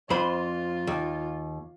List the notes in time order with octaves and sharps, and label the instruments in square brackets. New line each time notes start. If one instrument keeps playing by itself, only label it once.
[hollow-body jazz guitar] F2 C5 B5 [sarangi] F4
[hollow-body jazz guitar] D#2